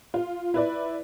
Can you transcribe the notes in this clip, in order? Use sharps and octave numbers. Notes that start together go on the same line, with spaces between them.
F4
E4 B4 D5